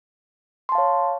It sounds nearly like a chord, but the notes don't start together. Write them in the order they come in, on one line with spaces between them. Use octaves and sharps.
C6 A5 F5 C#5